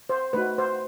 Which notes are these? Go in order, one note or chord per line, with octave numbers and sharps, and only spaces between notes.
C5
A3 D#4 F#4 B4
C5